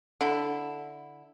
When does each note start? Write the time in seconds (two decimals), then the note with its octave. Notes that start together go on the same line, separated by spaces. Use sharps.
0.21 D3 E4